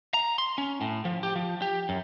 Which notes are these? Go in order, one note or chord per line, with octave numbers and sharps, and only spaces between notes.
A#5
C6
C#4
A2
F3
G4
F3
G4
F#2